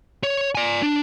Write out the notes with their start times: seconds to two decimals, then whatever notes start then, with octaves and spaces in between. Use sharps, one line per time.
0.23 C#5
0.55 D5 G#5
0.82 D4